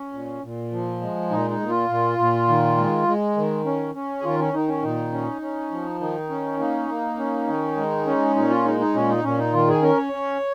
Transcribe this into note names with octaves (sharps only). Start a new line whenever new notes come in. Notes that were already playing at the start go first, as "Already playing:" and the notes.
Already playing: C#4
A#2
A#2
F3
G#3
A#2 D#4
D#4
A#2
F4
A#2
A#2
D#3
G#3
G#3
D#3
C#4
C#4
G#4
D#3 F4
C#4
D#3 D#4
C#4
A#2 D#4
C#4
C#4
F3
D#3 D#4
C#4
A#3 D#4
A#3
C#4
D#3
G#3
C#4
A#2 D#4
F4
G#3 D#4
D#4
A#2 C#4
D#4
A#2 C#4
D#4
D#3 F4
G#4
C#4 A#4
C#5
C#4